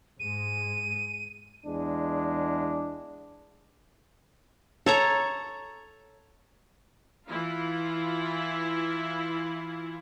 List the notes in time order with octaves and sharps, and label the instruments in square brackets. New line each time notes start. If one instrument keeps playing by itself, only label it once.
[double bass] G#2 G#3 [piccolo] D#7
[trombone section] E2 G#3 D4
[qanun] A4 C#5 A#5
[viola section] E3 E4 F4